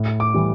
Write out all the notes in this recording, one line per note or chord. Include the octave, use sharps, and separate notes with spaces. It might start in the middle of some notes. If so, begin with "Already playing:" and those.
Already playing: A2
D6
E3 G3